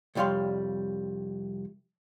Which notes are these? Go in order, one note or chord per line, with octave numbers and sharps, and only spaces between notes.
C2 F2 G3 C#5 F5 C6